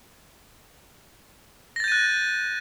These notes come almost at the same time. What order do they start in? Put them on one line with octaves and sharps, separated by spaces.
A#6 A6 G6 D#7 F#6